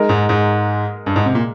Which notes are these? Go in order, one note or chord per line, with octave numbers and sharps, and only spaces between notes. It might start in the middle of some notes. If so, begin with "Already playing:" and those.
Already playing: G#3 D#4 A#4 D#5
G#2
G#2
G2
G#2
C3
A#2